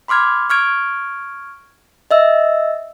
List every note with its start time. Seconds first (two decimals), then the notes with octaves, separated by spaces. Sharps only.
0.08 B5 C6 D6 F6 G#6
0.50 C#6 F6 G#6 D7
2.11 D#5 E5 E6